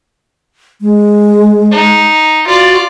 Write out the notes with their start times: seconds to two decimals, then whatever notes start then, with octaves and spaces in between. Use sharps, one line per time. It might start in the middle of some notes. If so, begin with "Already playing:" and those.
0.81 G#3
1.72 D#4
2.47 F4 F#4 D5